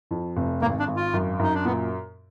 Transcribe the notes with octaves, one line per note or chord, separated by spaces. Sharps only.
F2
F1
G#1 A#3
D4
G#1
F4
F#2
F#2 D#4
D4
A#2 B3